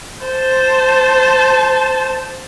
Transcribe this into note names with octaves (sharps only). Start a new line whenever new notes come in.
C5 A5